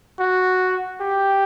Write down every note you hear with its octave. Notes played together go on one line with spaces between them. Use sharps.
F#4
G4